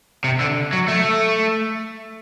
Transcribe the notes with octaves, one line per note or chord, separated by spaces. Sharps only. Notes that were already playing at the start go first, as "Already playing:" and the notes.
C3
D3
F#3
A3